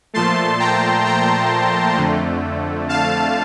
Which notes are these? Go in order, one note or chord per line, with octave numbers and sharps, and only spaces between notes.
A#2 F3 A3 A5 C6
G5 A#5
G5 A#5
F2 D3 A3
F5 A5